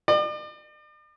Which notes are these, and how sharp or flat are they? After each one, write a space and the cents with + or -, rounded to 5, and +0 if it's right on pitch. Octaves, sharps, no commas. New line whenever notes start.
D5 +45